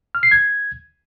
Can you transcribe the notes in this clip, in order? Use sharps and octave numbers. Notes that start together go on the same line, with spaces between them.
F6
C7
G#6